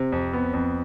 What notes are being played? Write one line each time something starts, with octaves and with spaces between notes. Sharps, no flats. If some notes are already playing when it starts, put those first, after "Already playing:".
Already playing: C3
F2
B3
F2